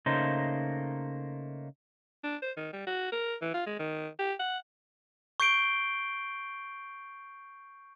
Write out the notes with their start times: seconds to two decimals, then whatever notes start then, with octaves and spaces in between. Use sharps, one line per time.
0.06 C#3 A3 A#3 D#4 C5
2.24 D4
2.42 C5
2.57 D#3
2.73 G3
2.87 F#4
3.12 A#4
3.42 E3
3.54 F4
3.67 G#3
3.79 D#3
4.19 G4
4.40 F#5
5.40 C#6 G6 C7 D7 G7